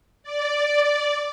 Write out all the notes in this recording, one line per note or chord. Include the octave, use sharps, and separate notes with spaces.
D5